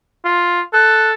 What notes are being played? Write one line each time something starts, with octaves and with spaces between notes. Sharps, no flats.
F4
A4 F#6